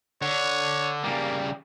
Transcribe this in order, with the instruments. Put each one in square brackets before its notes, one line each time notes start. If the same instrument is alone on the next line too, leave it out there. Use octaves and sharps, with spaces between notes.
[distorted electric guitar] D3 [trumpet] C#5
[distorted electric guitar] C#3 G3 [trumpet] A#3